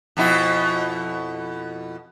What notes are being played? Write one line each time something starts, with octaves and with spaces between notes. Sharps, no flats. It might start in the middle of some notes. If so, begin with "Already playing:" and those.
F2 B2 E4